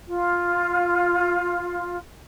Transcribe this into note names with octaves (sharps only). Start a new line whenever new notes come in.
F4